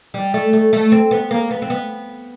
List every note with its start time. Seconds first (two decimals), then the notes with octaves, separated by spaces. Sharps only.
0.14 G3
0.34 A3
0.53 A3
0.73 A3
0.92 C4
1.11 B3
1.31 A#3
1.51 B3
1.62 C4
1.70 B3